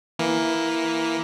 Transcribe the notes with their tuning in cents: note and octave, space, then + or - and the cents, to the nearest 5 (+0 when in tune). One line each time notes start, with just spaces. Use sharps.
E3 +0 A#3 +10